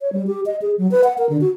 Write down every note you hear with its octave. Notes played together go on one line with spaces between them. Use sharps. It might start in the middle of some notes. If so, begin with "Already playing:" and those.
C#5
G3
G4
D#5
G#4
F#3
B4
F#5
A#4
D3
F#4